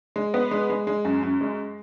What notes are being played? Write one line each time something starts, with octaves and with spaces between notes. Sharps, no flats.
G#3
B3
G#3
G#3
G#3
F#2
F#2
G#3